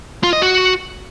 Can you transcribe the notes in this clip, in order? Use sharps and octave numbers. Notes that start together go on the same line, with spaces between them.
F4
D#5
F#4